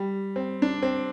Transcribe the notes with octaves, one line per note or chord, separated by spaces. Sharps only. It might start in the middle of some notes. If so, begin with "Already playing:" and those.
Already playing: G3
C4
D4
C4